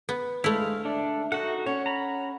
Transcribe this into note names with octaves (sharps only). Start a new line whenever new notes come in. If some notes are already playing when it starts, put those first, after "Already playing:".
B3
D2 G#3 A3 E4 F5
D4 A4 D5 E5
D#4 F#4 A4 F#5
C#4 C#5 F#5
A#5 B5